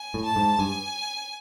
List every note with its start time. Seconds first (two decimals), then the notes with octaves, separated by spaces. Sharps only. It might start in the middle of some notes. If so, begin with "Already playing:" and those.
Already playing: G#5
0.14 A2
0.25 A5
0.36 G#2
0.59 G2 G#5